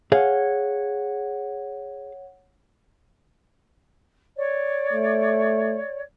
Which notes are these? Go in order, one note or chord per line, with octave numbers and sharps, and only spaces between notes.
G#4 C#5 F5 F#5
C#5 D5
A3